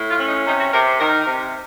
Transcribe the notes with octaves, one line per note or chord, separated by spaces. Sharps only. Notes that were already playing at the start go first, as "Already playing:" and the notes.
Already playing: A2
F4
C#4
D#4
C3 D#4
F#4
C3 A#4
C5
D#3 A#4
C3